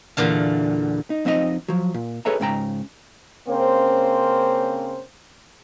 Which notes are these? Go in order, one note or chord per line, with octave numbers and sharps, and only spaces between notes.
E2 A#2 D3 F5
D#4
F2 C4 D#4 E4 D#5
F3 F#3
A#2
G#4 A4 B4 C#5 E5 A#5
C#2 G#2 C#3 G5 A#5
C#3 A#3 C4 C#4 C5